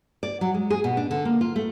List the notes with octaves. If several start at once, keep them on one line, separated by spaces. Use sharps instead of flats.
D5
F#3
G#3
G#4
B2
D4
D3
A#3
F4
A3